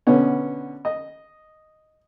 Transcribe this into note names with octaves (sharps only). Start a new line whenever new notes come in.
B2 D3 B3 C#4
D#5